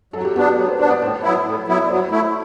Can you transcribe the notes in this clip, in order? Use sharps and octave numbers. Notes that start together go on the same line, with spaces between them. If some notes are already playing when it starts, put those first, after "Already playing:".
F#3 A4
F#4
G4
B3 D4 F#4
G4
F#3 B4
C5
B3 D4 C5
D5
A2 C5
F#3 B3 E4
A2
F#3 B3 E4
D5
F#3 C5
A3 E4